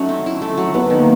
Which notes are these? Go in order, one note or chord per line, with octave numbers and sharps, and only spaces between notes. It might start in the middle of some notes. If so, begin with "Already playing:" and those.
Already playing: F#3 A3 C#4 D#4
C4
E4
A3
F#3
F#3 B3
D#3
A#3